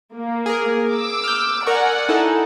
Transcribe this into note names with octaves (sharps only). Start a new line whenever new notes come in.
A#3
G#4 A#4
D6 E6
F6 G6
A#4 D5 F#5 G#5 C#6
D#4 E4 A4